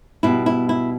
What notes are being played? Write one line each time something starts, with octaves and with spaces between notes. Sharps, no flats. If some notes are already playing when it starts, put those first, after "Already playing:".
B2 G3 E4
E4
E4